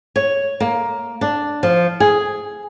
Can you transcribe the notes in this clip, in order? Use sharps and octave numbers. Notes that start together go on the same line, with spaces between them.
C#5
A#3
D4
F3
G#4